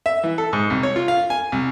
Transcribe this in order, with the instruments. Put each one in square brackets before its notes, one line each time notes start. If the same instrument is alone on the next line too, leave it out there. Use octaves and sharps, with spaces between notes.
[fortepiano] E5
E3
A4
G#2
C2
C#5
F4
F5
G#5
C2